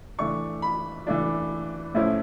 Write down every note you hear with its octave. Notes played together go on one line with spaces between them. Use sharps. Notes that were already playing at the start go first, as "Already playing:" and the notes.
E3 A3 D4 C#6
B5
E3 A3 D4
A2 F3 A3 C#4 E4